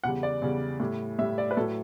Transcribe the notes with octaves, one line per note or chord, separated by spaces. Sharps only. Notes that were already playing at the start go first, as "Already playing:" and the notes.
E2 C#3 G3 F#5
D5
E2 C#3 G3
A2 G3
A2 G3 E5
D5
B4
A2 F#3 A4